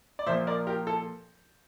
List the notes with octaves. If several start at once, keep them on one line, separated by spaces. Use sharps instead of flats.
D5
A#2 F3 A#3 C5 E5
A#4 D5
G4 A#4
A4